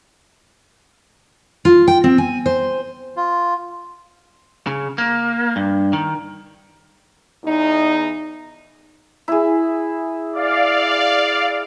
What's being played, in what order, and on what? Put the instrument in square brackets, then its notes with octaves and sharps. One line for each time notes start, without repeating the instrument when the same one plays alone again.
[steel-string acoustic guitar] F4
G5
C4
G#5
C5
[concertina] F4
[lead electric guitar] C#3
A#3
G2
D#3
[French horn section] E2 D#4
[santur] E4 G#4
[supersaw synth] D5 F5